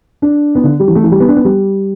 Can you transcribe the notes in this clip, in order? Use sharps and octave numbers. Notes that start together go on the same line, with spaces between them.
D4
B3
D3
G3
E3
A3
E3
G3
B3
D4
B3
G3